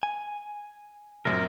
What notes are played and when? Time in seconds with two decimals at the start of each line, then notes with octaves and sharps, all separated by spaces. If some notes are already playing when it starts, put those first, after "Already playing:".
0.03 G#5
1.25 A#1 F#2 C4 A#4